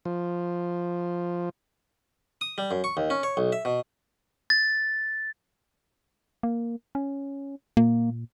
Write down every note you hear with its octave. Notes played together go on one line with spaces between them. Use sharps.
F3
D#6
G3
F#2
C#6
D#2
C#4
C#5
B1
E5
B2
A6
A#3
C#4
A#2 A#3